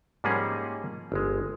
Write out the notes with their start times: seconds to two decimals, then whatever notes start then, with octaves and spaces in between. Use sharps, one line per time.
0.24 G#2 F3 G3 A#3 C#4 G#4
1.12 G1 G#3